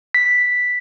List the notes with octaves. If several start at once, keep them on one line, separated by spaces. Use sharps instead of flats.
B6